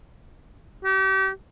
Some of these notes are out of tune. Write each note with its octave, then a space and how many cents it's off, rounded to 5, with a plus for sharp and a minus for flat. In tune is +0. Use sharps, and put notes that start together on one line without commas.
G4 -35